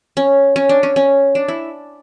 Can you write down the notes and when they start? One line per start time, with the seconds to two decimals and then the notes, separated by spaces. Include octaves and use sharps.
0.17 C#4
0.56 C#4
0.69 D4
0.83 C#4
0.96 C#4
1.35 D4
1.48 E4